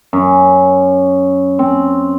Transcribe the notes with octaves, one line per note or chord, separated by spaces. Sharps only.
F#2
C4